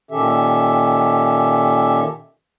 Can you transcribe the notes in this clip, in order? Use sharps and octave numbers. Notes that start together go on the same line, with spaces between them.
A#2 D#3 C#4 G4 A4 E5